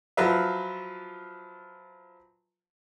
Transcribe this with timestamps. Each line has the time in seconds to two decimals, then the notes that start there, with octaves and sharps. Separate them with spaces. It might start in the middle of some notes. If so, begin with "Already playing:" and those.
0.17 F3 F#3 F4 B4 E5